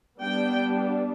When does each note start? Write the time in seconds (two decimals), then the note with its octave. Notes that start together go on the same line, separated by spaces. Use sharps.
0.22 G3 B3 D4 G5